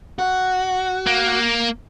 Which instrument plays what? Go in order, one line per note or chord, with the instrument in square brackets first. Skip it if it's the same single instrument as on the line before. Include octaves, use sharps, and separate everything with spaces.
[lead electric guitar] F#4
[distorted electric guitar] A#3